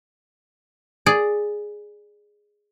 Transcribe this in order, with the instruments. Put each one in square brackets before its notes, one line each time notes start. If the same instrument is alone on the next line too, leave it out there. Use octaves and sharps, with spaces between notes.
[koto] G#4 D5